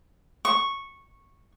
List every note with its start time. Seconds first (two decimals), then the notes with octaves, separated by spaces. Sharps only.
0.45 C#6